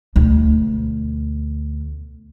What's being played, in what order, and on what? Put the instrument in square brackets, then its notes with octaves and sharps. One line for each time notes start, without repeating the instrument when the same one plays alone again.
[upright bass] D2 B2